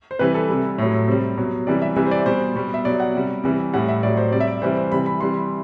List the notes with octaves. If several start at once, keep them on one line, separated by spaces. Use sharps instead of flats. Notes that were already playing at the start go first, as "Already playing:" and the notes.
C5
C3 E3 G3 B4
A4
C3 G3
A2 F#3
C3 G3 C5
B2 F#3
C3 E3 G3 D5
E5
C3 E3 G3 E5
C5
D5
B2 G3 C5
B2 G3
E5
B2 F#3 D5
F#5
C3 G3
C3 E3 G3
A2 G3 F#5
E5
A2 F#3 D5
C5
C3 G3 D5
E5
D5
C3 E3 G3 C5
C5
C3 E3 G3 B5
B5
C3 E3 G3 C6